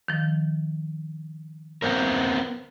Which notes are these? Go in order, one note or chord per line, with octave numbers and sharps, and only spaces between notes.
D#3 F3
B3 C4 A#4